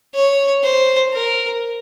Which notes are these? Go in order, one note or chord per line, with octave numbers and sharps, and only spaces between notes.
C#5
C5
A#4